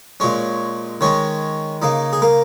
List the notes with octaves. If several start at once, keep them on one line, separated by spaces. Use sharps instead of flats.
A#2 G#3 C#4 C#5
D#3 G#3 C#4 C#5
C#3 A#3 D#4 D#5
G#4
A#3 A#4